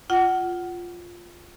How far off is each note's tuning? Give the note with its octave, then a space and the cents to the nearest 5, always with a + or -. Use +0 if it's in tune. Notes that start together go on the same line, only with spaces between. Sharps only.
F4 +0 F#5 +20